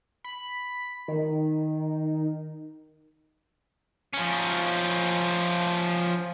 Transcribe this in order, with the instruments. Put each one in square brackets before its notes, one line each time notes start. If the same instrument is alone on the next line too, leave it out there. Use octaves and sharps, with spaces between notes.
[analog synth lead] B5
D#3
[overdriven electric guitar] F3 C#4